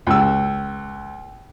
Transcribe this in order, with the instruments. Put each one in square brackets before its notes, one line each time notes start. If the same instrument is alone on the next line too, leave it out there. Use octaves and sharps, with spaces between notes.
[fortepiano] C#2 E6